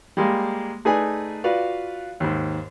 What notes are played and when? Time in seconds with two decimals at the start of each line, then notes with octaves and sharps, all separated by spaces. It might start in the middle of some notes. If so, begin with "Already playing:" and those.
0.17 G3 G#3 A#3
0.85 A3 D#4 G#4 B4 D5 G#5
1.44 F4 F#4 B4 D5 F5
2.20 D#2 G#2